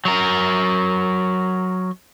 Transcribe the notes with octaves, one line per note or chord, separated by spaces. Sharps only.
F#3 A#4